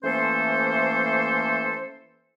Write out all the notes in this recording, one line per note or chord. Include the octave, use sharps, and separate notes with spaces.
E3 A3 A#3 C#4 A4 C5